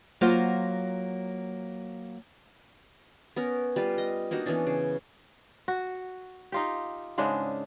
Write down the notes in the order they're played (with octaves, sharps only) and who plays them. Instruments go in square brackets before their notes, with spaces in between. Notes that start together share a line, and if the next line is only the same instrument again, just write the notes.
[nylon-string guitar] F#3 A#3 F4 C5
[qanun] B3 C#4 A#4
G3 F4 B4
D#5
A#3 D4 D#4 F#4
E3 B3 C#4 D4
C#3
[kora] F#4
D#4 F4 G4
G#2 C#3 G#3 D4